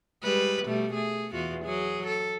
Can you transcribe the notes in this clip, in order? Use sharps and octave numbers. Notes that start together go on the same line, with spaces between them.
G3 G#3 B4
B2 G3 A3
A3 G#4
E2 F4 F#4
F#3 G#4
A4